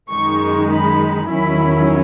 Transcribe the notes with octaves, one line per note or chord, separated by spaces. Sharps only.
F#2 D#3 G#3 D#4 C#6
B5
E2 D#3 F#3 C#4 E4 B5